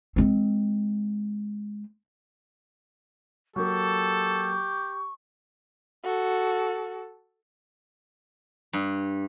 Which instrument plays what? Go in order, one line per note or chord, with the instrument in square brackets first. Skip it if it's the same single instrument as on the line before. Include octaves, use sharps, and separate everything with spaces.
[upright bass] G#3 C4
[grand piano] F#3 A#3 [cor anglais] G4 [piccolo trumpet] A4 [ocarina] C#6
[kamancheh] F#4 A4
[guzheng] G2